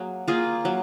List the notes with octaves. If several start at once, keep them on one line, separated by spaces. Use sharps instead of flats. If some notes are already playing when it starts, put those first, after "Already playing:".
Already playing: F#3 A#3 G#4
A#3 F4 G#4
F#3